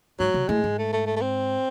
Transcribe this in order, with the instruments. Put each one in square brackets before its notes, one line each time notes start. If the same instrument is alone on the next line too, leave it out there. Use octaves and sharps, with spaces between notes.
[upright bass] G#2 [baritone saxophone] F#3
[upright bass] C3
[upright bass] A2 [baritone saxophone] G#3
[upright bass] G#2
[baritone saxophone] A3
A3
A3
A3
C4